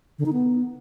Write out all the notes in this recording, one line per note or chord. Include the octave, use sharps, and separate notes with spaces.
D3
D#4
B3